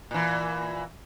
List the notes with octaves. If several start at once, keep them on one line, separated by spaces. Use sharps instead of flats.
A#2 E3